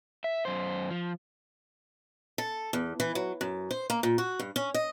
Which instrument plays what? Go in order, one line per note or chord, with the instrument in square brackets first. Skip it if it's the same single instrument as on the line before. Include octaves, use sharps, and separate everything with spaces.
[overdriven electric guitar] E5
F#2 C5
F3
[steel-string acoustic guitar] A4
E2
E3
F#3
F#2
C5
A#3
A#2
F#4
G2
C#4
D#5